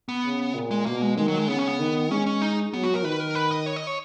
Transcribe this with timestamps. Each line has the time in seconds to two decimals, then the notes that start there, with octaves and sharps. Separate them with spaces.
0.08 B3
0.24 C#3
0.54 A#2
0.71 G#3
0.86 B2 A#3
1.02 G#3
1.17 D#3 G#3
1.28 F#3
1.38 G#3
1.48 C#3 B3
1.58 C#4
1.68 B3
1.79 D#3
2.10 G#3 C#4
2.26 C#4
2.42 D#4
2.73 F#3 B3
2.83 F#4
2.94 A#4
3.04 D#3 B4
3.20 A#4
3.35 B4
3.51 D#5
3.66 C#5
3.76 D#5
3.87 C#5